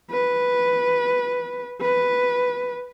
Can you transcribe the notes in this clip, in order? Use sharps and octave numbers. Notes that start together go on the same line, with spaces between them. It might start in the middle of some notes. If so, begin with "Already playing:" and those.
B4
B4